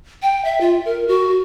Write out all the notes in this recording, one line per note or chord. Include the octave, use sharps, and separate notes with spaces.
G5
E5
F4
A#4
F#4